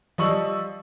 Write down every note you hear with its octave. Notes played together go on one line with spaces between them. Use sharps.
F3 G3 D#5 C#6 E6 F#7